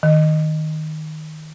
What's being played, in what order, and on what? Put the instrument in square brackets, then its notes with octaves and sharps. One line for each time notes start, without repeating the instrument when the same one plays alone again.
[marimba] D#3